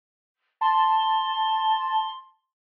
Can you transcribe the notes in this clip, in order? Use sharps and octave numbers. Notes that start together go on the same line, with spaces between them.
A5 C6